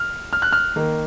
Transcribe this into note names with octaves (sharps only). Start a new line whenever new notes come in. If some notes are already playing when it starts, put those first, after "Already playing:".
Already playing: F6
F6
F#6
F6
D#3 A#3